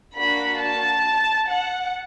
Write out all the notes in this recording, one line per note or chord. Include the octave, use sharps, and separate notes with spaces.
A#3 D4 F#4 B5
A5
F#5